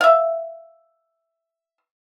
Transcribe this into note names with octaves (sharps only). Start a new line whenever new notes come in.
E5 F5